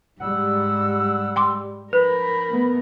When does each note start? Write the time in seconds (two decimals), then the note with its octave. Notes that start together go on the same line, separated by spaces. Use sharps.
0.21 G#2 G3 F#5 E6
1.36 G5 C6 D6
1.93 F3 D#4 A#4 B4 B5
2.48 A3 B3